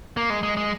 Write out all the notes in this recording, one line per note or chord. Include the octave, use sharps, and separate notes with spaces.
A#3
G#3
G#3
G#3